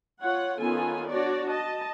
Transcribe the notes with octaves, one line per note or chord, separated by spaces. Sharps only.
F4 C#5 F#5
D#3 B3 C#4 F4 A4 G#5
D4 F#4 C#5 D5
D#5 A5